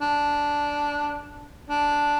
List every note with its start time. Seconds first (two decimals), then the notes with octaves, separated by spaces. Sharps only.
0.01 D4
1.69 D4